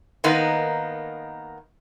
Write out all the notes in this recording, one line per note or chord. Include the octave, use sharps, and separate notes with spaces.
D#3 A#3 B3 D#4